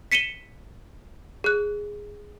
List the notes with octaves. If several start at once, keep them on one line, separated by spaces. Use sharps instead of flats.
B6 C#7 D#7 E7 G7
G#4 F#6